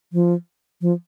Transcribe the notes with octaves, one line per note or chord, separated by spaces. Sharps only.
F3
F3